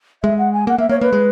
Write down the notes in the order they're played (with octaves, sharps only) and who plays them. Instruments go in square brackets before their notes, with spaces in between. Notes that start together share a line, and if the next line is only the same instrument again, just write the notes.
[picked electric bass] G#3 [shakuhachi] E5
[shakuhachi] F#5
G#5
[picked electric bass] A#3 [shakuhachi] F#5
[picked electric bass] A#3 [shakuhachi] E5
[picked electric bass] A#3 [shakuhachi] C#5
[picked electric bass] A#3 [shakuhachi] B4
[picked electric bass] G#3